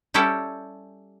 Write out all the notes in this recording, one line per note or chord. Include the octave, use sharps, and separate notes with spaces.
G3 C#4 E4 A4 G5 A5